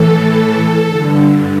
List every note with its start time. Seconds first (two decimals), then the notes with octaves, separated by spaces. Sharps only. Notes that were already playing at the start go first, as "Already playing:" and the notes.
Already playing: A2 E3 A4
0.88 G2 D3